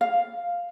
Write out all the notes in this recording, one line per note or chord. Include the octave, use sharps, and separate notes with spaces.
F5